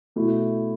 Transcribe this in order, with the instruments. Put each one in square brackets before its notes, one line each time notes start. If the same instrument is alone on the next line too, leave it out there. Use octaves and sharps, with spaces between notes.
[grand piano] B2 A3 E4